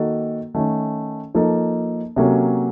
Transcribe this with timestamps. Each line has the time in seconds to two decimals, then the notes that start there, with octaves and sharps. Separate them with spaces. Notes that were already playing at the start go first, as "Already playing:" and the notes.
Already playing: D#3 A#3 D#4 F#4 A4
0.54 D#3 A3 C#4
1.35 F3 A#3 D#4 A4
2.16 C3 F#3 A#3 C#4 A4